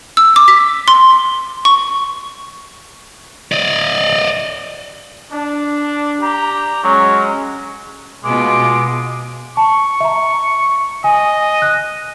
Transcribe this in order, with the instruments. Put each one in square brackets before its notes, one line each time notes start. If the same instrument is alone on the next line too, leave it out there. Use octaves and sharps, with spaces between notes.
[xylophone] E6
D6
B6
C6
C#6
[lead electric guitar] D5 D#5
[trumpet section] D4
[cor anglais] G4 [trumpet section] A#5
[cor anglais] F#3 [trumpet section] G#3 C#4
[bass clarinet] B2 [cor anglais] G#3 [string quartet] B3 F4 [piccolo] D6
[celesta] A5 [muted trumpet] C#6
[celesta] E5 A#5
[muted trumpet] D#5 [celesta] G#5
[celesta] F#6